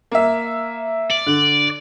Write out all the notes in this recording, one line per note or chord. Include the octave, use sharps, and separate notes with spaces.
A#3 E5
D5
D3